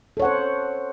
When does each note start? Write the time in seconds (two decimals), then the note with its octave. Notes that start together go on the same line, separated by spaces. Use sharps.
0.17 A4
0.20 C#5
0.22 F#5
0.25 C5